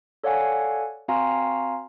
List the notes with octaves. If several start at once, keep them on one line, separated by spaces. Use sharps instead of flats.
A4 C#5 D5 F5 F#5 G#5
C4 F#4 F5 G#5 A#5 C6